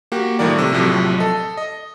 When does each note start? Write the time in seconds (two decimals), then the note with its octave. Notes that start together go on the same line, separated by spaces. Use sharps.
0.12 A#3 F#4 G4
0.39 A2 D#3 F3 G3 A#4 D5
0.56 C3 A3
0.73 A#1 A2 C3 F3 F#3
1.18 A4 D#5
1.57 D#5